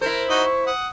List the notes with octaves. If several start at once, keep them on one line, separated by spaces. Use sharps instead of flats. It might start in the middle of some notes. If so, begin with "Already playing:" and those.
E4 A#4 C5
D#4 F#4 D#6
C#6
F#5 D#6